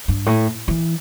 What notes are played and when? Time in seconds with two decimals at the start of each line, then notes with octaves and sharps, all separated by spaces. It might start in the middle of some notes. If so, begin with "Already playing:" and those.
0.08 G2
0.26 A2
0.68 E3